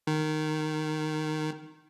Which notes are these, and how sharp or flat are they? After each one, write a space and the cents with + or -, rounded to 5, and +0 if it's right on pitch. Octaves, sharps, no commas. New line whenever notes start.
D#3 -10